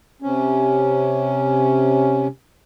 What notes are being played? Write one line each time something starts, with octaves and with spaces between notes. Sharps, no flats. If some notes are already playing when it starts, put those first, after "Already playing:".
C3 C#4